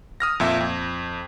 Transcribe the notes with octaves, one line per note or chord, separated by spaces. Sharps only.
D#6 F6 A#6
F2 A#2 E5
F2